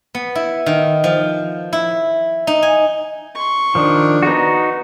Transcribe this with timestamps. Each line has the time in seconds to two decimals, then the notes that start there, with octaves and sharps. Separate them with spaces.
0.15 B3
0.35 E4
0.66 D#3
1.04 F3
1.73 E4
2.47 D#4
2.63 G#5
3.35 C6 C#6
3.75 D#3 F3 D4
4.23 B3 D#4 F#4